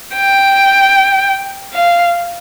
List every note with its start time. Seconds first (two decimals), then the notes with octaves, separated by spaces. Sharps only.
0.16 G5
1.74 F5